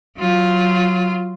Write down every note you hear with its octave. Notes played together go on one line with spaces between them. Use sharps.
F#3 F4